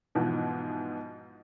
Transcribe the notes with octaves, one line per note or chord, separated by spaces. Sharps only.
G#2 B2 E3 F3